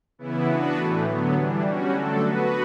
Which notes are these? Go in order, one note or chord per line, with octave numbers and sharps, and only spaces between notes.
C#3 E3 B3 E4
B3 D4 F#4 B4
A2 E3 A3
D3 F#3 B3
E3 G3 D4
G3 C#4 F#4
D3 F#3 A3 D4 A4
B3 F#4 B4